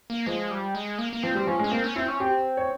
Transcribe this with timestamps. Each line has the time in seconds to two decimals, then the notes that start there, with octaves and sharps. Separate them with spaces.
0.10 A#3
0.26 F3 G#3
0.51 G3
0.75 G#3
0.99 A#3
1.13 A#3
1.23 F3 C4
1.35 G3
1.47 F3 C#4
1.59 G#3
1.64 C#4
1.71 A#3 C4
1.84 C#4
1.96 C4 E4
2.08 C#4
2.20 C4 G4
2.57 C#5